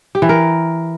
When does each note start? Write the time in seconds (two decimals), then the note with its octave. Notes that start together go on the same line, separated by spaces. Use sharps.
0.15 G4
0.22 E3
0.29 A#4